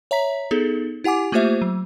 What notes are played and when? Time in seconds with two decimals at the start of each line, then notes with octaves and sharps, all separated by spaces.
0.11 C#5 E5 A#5 B6
0.51 B3 D#4 G#4 A4
1.04 E4 G4 F#5 G#5 D6
1.32 A3 A#3 F4 G4 C5 E5
1.62 F#3